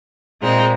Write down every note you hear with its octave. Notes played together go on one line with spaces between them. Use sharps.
A#2 G#3 C4 D#4